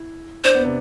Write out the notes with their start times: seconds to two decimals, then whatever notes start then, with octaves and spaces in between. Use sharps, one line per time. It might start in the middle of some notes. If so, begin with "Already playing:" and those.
Already playing: E4
0.44 D4 C5
0.55 B3
0.64 C3